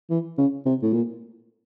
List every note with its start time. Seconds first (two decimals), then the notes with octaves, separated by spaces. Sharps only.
0.10 E3
0.38 C#3
0.65 C3
0.82 A2
0.93 A#2